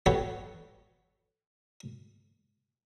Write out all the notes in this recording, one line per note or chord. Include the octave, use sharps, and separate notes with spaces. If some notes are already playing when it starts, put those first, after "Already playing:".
G4 A4 B4 C#5 F#5